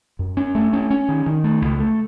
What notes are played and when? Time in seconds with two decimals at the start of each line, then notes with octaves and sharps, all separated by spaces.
0.19 F#2
0.37 C#4
0.55 A3
0.73 C#4
0.91 C#4
1.09 D#3
1.26 D#3
1.44 A3
1.62 C#2
1.80 A3